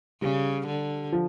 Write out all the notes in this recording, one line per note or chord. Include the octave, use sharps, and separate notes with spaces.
C#3 G3
D3
F3